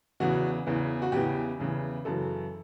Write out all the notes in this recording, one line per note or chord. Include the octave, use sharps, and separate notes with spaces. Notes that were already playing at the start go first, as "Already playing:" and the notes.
E2 C#3 E3 F#4
E2 C#3 E3
F#4
E2 C#3 E3 G4
E2 C#3 E3
F#2 C#3 E3 A4